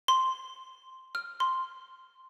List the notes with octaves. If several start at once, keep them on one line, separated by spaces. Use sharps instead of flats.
C6
F6
C6